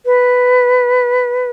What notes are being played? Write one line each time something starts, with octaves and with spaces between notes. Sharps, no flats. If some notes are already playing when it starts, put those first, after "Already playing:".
B4